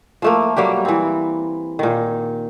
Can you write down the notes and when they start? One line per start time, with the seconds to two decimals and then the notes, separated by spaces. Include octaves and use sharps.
0.22 F3 A3 A#3
0.57 F#3 G3 A#3 G4
0.85 E3 C4
1.79 A#2 D#3